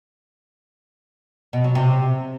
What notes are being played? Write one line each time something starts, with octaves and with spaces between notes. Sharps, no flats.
B2
F#3
C3